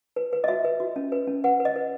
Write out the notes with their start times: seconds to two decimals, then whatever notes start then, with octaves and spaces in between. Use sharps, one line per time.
0.16 B4
0.33 B4
0.44 D#5
0.48 F#4 E5
0.64 B4
0.80 F#4
0.96 C#4
1.12 B4
1.27 C#4
1.44 B4 F#5
1.60 B4
1.65 D#5
1.76 B4